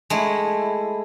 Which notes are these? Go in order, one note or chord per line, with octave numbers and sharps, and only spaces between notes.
G#3 A3 E4